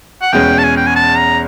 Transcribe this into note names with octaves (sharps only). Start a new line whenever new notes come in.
F#5
E2 B2 G#3 C#4 G5
A5
G#5
G5
G#5
A5
A#5